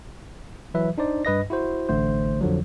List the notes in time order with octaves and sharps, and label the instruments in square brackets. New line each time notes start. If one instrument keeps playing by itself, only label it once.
[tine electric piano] E3 F#3 B4 E5
D4 D#4 C5 D5
G2 B4 D#5 A#6
E4 F#4 C5
A1 D3 A3 C5
F2 D3 F3 F#3